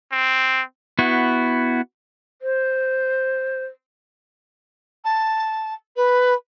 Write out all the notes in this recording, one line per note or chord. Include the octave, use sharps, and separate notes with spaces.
C4
B3 E4 F#4
C5
A5
B4